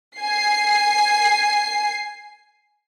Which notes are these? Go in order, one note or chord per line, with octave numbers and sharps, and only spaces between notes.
G#5 C7